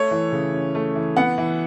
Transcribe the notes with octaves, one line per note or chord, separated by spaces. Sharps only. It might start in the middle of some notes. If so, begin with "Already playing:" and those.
Already playing: A3 C#5
E3
C#3
C#4
A3
E3
B3 F#5
E3